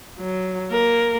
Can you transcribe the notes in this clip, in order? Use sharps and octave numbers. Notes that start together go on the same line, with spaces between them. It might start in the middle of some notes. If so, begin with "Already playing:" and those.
F#3
A#3 A#4